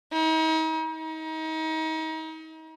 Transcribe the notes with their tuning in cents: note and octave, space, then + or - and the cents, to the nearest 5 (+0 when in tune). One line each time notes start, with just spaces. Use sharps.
D#4 +40
D#4 +35